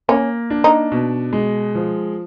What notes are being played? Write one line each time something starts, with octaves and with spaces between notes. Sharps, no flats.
A#3 C#4
D4
D#4
B2
G#3
F3